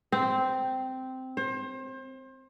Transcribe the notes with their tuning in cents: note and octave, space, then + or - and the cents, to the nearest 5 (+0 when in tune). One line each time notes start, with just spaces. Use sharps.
C4 -10
C5 +30